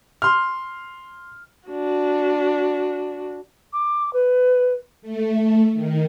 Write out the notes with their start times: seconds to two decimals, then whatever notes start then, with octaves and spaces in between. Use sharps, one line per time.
0.22 C6 F6
1.68 D4 F#4
3.73 D6
4.13 B4
5.02 A3
5.73 D#3